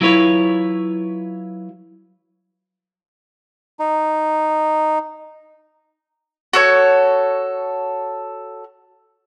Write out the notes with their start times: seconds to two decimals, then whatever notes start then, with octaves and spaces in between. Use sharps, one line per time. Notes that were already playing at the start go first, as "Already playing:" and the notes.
0.01 F#3 E4 F4 B4 C#5
3.80 D#4
6.53 F#4 A4 C#5